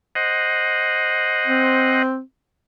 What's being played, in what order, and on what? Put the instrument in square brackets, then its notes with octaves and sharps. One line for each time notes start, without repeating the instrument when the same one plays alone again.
[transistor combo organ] C5 D#5 F#5
[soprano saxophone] C4